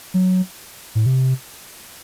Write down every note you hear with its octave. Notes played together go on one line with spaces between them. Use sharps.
F#3
A2
C3